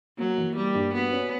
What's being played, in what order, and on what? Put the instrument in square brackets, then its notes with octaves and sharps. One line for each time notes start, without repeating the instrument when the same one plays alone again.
[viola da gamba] F#3 [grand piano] A#3
[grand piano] E3
[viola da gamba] G3 [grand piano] A#3
[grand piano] G2
[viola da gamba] B3 [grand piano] F#4
[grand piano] C#4